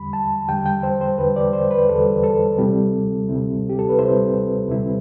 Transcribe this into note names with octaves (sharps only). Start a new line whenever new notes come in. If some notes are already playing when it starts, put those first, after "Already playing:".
Already playing: E2 D3 G3 B5
A5
E2 D3 G3 G5
G5
C5
C5
E2 D3 G3 B4
D5
C5
B4
E2 D3 G3 A4
A4
D2 C3 G3 C4 E4
D2 C3 G3 C4 E4
G4
A4
B4
D2 C3 G3 C4 E4 C5
D2 C3 G3 C4 E4